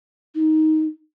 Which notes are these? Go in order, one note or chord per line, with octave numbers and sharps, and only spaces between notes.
D#4